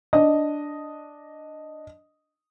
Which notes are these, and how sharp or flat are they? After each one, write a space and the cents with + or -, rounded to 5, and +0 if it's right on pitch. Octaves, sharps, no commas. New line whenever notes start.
D4 +0 D#5 +0